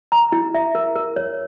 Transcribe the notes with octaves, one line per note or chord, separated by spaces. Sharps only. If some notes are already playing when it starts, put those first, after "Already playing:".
A#5
E4
E5
A#4
A#4
C#5